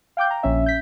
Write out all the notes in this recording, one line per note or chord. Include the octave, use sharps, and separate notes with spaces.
F5 G5 D6 G6
A#5
A#1 C#4 E5
G6 B6